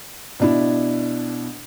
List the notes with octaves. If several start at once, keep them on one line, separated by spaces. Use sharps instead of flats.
B2 D4 E4